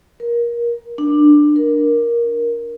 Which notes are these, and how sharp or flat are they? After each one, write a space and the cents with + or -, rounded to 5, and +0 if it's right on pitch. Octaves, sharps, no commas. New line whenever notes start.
A#4 +20
D4 +10
A#4 +10